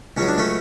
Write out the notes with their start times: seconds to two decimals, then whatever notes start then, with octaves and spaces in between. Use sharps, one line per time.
0.17 C#2 C#3 F#3 C#4
0.27 D4
0.38 A3 C#4